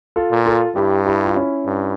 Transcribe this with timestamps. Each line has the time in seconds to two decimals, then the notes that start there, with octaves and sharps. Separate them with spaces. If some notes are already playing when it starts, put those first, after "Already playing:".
0.16 F4 A4
0.31 A#2
0.46 F4 A4
0.75 G2 E4 G4
1.06 E4 G4
1.25 F4
1.36 C#4 E4
1.66 G2